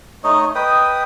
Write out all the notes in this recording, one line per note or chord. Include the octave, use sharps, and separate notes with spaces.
A3 D#4 C#5 D#5
B4 D#5 G5 D#6